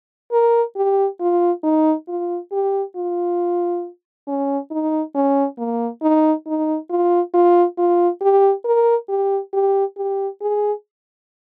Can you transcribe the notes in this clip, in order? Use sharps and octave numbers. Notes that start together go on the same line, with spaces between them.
A#4
G4
F4
D#4
F4
G4
F4
C#4
D#4
C#4
A#3
D#4
D#4
F4
F4
F4
G4
A#4
G4
G4
G4
G#4